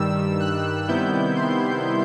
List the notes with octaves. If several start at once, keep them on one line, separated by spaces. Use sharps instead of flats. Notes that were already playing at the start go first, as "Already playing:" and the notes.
Already playing: G2 D#3 G3 E6
F#6
C3 D#3 G3 B3 E4 G6
C6